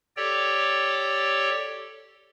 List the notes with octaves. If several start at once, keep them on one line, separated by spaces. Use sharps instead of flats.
G4 A4 C#5 D5 G5